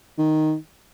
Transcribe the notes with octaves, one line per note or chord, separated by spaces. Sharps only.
D#3